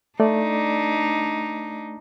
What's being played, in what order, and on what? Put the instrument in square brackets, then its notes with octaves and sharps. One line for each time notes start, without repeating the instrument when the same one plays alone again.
[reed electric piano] A3 D5 [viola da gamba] D4 D#4